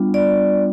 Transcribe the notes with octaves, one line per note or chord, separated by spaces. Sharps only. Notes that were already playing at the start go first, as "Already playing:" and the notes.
Already playing: G3 B3 D4 F4
D5